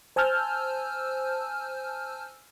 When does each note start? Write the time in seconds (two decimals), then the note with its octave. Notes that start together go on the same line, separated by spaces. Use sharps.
0.16 C5 G#5 A5 E6 F6 G6